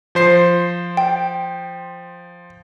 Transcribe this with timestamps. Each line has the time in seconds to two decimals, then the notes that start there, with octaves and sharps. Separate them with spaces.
0.15 F3 C5 C7
0.97 G5